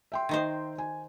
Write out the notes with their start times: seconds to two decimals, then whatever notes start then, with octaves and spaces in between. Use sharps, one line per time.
0.12 E5 G5 C6
0.29 D#3 D#4 C5
0.78 G#5